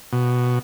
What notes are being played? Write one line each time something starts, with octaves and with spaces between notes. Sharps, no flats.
B2